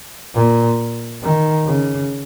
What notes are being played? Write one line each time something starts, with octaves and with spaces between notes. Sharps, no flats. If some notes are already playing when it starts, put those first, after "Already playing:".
A#2
D#3
C#3